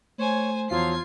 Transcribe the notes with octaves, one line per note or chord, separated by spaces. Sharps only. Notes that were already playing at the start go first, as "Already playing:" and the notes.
A3 C5 C#5 G#5
E2 F3 F#3 F4 F5 G#6 C7